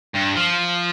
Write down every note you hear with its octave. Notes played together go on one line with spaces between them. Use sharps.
G2
F3